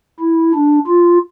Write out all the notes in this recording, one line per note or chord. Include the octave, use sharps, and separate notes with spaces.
E4
D4
F4